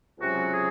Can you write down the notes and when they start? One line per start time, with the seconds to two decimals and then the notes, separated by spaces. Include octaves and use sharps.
0.19 C#2 C3 F#3 C#4 F#4
0.52 G#4